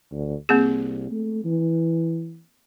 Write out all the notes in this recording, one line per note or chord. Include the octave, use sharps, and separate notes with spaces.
D2
C2 A#3 C4 G#4
A3
E3